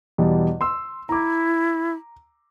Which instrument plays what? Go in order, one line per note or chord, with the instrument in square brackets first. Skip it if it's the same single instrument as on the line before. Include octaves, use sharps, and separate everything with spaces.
[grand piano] E2 B2 G3
C6 E6
[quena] E4 [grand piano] A#5 D6